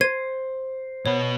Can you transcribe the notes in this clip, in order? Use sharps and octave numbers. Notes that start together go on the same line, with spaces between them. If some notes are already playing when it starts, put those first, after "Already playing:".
C5 G#6 D#7
B2 B4 C#5